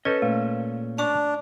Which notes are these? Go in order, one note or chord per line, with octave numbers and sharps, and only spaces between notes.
C#4 A4 B4 D#5
A#2 A3
D4 A5 C#6 D6